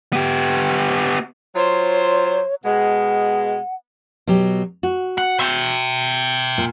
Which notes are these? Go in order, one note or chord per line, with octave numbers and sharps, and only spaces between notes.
B3 G4
F#3 F4 C5 C#5
B2 G#3 F#5
B2 F#3 G4
F#4
F#5
E5 G5
A#2